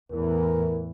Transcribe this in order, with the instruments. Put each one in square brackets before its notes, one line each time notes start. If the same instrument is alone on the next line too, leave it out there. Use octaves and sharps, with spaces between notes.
[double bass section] E2 A2 E3 [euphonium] A#4